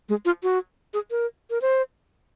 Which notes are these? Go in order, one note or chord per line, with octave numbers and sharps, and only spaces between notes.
G#3
F4
F#4
G#4
A#4
A#4
C5